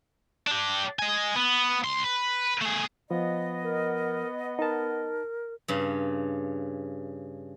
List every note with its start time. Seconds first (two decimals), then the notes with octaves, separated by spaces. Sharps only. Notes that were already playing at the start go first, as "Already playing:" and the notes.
0.47 D4 G4
0.99 D#5 G#5
1.36 B3
1.84 C#2 C6
2.04 B4
2.62 A3 G#4
3.11 F3 B3 D#5
3.64 A#4
4.59 D#4 A#4 A5
5.68 G2 C#3